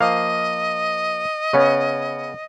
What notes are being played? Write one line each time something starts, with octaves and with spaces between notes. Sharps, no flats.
F3 A#3 D#5 F5
C#3 B3 C#4 C#5